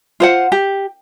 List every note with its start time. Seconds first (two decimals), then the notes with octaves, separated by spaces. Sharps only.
0.20 F4 C5 F#5
0.52 G4